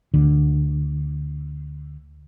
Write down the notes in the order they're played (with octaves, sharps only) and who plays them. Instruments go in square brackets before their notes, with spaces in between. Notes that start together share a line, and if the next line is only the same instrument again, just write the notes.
[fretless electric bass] D2 D3